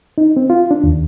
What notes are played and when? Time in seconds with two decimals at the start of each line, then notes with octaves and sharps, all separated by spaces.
0.18 D#4
0.37 C4
0.50 F4
0.71 D4
0.84 D#2